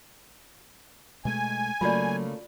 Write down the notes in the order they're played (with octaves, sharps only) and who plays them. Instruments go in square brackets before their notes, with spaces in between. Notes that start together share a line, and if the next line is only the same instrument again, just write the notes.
[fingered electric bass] B2 G#3 A3 [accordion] G#5
[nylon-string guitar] C#3 A3 A#3 [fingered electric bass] F#3 [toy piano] F4 F#4 D5